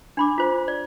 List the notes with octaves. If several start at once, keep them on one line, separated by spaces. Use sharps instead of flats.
D4 B5 D6
F4 C5
D5